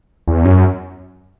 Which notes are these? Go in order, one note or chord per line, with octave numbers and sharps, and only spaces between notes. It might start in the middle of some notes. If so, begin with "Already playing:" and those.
E2
F#2